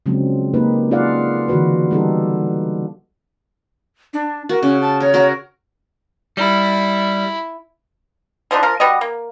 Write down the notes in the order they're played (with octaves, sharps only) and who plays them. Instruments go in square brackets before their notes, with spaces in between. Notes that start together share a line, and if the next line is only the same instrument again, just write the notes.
[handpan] C#3 F3 F#3 G#3 C4 D4
A#3 D#4 G4 B4
D#4 F4 G#4 D5 F5 F#5
D3 E3 F#4 B4
G3 B3 D4 D#4 G4 A4
[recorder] D4
[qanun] F#4 [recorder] A#4
[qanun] C#3 [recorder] C#4
[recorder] A5
[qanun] A#4 [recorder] C#5
[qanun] F#4 A#4
[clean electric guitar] G3 [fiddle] E4
[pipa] D3 F3 D4 D#4
F3 A#4
G3 B3 F#4 D#5
A#3